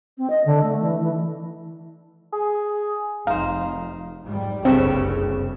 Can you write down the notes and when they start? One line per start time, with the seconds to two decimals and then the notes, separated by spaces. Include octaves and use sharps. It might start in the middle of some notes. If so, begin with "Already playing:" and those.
0.18 C4
0.30 D#5
0.45 D3
0.63 A3
0.80 E3
1.00 E3
2.33 G#4
3.27 F1 D#4 C5 F5
4.24 G#2 G3
4.65 F#1 C2 G2 C#3 C4 A4 E5